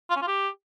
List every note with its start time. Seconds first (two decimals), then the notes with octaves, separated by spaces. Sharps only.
0.10 F4
0.16 C#4
0.22 F4
0.28 G4